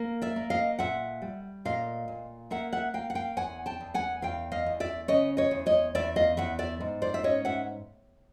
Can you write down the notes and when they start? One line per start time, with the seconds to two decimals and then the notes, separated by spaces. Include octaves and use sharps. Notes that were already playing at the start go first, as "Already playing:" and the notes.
Already playing: A#3
0.21 D5 E5
0.36 A#3
0.50 D#5 F5
0.79 A#2 E5 F#5
1.22 G3
1.65 A#2 D#5 F5
2.08 A#2
2.51 A#3 E5 F#5
2.73 E5 F#5
2.94 A#3 F5 G5
3.10 F#5
3.15 F5 G5
3.37 E2 F#5 G#5
3.66 G5 A5
3.81 E2
3.94 F#5 G#5
4.22 E2 F5 G5
4.52 D#5 F5
4.66 E2
4.80 D5 E5
5.08 C#3 C#5 D#5
5.37 C#5 D#5
5.51 E2
5.66 C#5 D#5
5.95 E2 D5 E5
6.16 D#5 F5
6.37 E2 E5 F#5
6.59 D5 E5
6.81 G#2
7.02 C5 D5
7.14 E5
7.23 C#4 C#5 D#5
7.45 E5 F#5